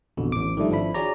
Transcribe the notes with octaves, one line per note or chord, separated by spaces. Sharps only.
A1 F2 B2 D3
A1 D6
D#3 F3 G3 A3 D4 E4
G#1 F3 D4 E4 B5
F#4 G#4 C#5 D5 A#5